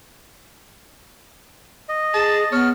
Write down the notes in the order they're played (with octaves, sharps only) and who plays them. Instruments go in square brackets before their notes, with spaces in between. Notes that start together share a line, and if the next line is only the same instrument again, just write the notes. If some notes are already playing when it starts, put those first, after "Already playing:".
[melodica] D#5
[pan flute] G#4 [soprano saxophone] A5
[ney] B3 [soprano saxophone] C#5 [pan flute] F6